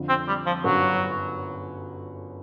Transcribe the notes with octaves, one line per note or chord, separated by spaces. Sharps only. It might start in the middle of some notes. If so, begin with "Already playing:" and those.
Already playing: F2 D3 F3
C4
G3
F3
G1 F#2 D3 F#3